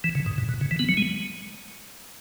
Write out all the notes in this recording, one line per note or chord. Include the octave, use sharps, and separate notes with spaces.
E3
C#3
G#2
B2
B2
C#3
E3
B3
F#3
G#3